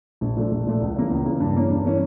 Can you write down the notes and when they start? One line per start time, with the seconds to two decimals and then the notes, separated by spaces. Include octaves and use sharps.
0.21 A#1
0.36 A#2 F3 A3 D4
0.51 A#1
0.67 A#2 F3 A3 D4
0.81 C#2
0.96 C#3 E3 A#3
1.11 C#2
1.26 C#3 E3 A#3
1.40 G2
1.55 E3 A#3 C#4
1.70 G2
1.85 E3 A#3 C#4